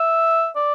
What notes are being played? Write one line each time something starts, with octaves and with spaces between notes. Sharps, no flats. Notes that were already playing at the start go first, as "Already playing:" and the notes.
Already playing: E5
D5